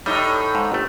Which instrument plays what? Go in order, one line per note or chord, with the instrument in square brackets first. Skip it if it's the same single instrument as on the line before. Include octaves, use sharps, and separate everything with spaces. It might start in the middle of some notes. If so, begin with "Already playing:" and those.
[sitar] A2 D#4 [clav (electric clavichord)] G3
[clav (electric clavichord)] G#2
G1 A3